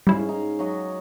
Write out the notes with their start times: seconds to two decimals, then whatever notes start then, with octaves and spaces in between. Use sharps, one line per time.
0.07 G#2 G3 C#4 E4 F5
0.29 D#4
0.59 F#3 F#4 D#5